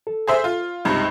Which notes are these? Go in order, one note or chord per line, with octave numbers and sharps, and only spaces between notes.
A4
G#4 C5 E5
F4
C#2 G2 C3 G#3 D#4